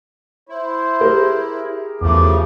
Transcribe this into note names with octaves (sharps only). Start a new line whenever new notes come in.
E4 C5
G4 G#4 A#4
E2 C#3 F3 A3 D6